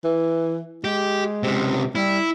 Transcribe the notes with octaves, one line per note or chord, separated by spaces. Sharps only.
E3
G#3 G4
C#2 C3
G3 E4